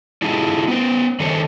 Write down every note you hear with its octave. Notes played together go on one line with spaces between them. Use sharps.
D4 E4 F4 G#4
B3 C5
D#3 D4 A4 C5 C#5